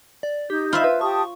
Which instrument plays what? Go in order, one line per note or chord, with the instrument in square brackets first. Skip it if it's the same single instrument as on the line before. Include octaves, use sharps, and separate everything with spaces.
[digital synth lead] D5
[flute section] D#4 G6 [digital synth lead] G4
[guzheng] F4 C5 E5 [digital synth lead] B5
[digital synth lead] B4
[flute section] G4 A5 D#6 [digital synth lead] C#6